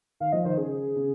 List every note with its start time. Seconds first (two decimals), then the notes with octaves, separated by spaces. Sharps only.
0.20 D#3 F5
0.32 F3 D#5
0.45 D#3 C5
0.58 C#3 G#4
0.96 C#3